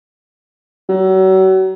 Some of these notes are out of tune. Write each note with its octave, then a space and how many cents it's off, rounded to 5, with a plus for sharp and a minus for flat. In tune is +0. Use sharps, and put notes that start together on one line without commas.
F#3 +35